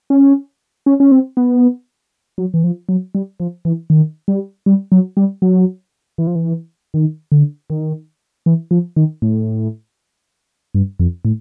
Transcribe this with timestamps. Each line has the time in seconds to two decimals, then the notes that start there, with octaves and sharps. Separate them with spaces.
0.10 C#4
0.86 C#4
1.00 C#4
1.12 C4
1.37 B3
2.38 F#3
2.54 E3
2.64 F3
2.89 F#3
3.15 G3
3.40 F3
3.65 E3
3.90 D#3
4.28 G3
4.66 G3
4.92 F#3
5.17 G3
5.42 F#3
6.18 E3
6.27 F3
6.35 E3
6.94 D#3
7.32 D3
7.70 D#3
8.46 E3
8.71 F3
8.96 D#3
9.22 A2
10.75 G2
11.00 F2
11.25 A2